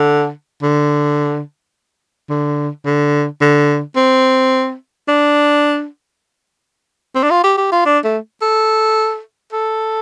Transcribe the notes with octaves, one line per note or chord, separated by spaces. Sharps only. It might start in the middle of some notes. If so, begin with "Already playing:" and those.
Already playing: D3
D3
D3
D3
D3
C4
D4
C4
D4
F4
G4
G4
F4
D4
A3
A4
A4